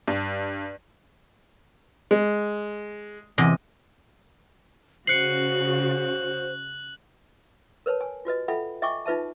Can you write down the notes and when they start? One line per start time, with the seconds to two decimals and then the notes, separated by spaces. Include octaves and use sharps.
0.08 G2
2.11 G#3
3.38 E2 C3 D#5
5.07 C#3 F#4 C5 F#6 C7 C#7 F#7
7.86 A#4 B4 C#5 A5
8.01 G#5
8.25 F4 F#4 B4 D#5
8.48 F4 A4 E5 F#5 G5 B5
8.82 D#5 E5 G5 G#5 C#6 D6
9.06 D#4 F4 B4 E5 A5